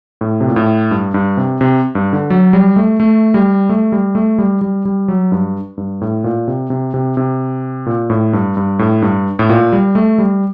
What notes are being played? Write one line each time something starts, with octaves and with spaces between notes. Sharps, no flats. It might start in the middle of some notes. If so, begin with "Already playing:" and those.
A2
C3
A#2
A2
G2
G2
C3
C3
G2
D3
F#3
G3
A3
A3
G3
A3
G3
A3
G3
G3
G3
F#3
G2
G2
A2
A#2
C3
C3
C3
C3
A#2
A2
G2
G2
A2
G2
A2
A#2
G3
A3
G3